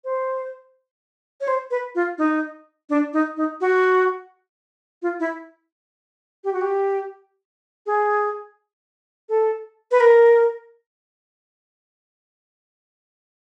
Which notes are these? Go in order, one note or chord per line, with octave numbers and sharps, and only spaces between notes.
C5
C#5
C5
B4
F4
D#4
D4
D#4
D#4
F#4
F4
E4
G4
F#4
G4
G#4
A4
B4
A#4